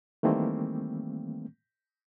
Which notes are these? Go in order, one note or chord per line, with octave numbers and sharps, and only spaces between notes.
D#3 E3 G3 A3 A#3 C4